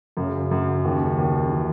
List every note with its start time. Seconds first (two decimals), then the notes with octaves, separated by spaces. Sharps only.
0.17 F#2 C#3
0.51 F#2
0.85 D#2
1.18 D#2
1.51 E3